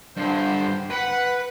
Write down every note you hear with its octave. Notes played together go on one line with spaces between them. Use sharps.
G2 D3 G4 C5
B4 F#5